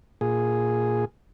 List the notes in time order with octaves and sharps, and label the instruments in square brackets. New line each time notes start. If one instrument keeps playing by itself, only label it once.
[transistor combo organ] A#2 G#4